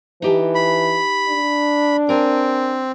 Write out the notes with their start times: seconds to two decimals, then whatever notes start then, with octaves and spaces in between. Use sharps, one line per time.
0.22 E3 D#4 G4 A5
0.55 B5
1.29 D4
2.09 C4 A#4 G#5